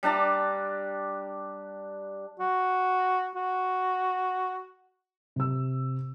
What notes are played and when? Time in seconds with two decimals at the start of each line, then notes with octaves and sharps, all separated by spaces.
0.03 G3 D4 A5 A#5
2.40 F#4
3.36 F#4
5.36 C3 E6